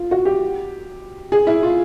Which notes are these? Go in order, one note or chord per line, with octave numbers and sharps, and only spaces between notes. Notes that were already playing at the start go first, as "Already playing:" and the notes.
Already playing: F4
F#4
G4
G#4
E4
F4